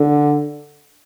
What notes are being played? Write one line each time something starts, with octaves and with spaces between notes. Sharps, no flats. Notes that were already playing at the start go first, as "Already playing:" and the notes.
Already playing: D3